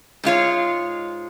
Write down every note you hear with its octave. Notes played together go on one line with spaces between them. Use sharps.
G#2 G#3 F4 C#5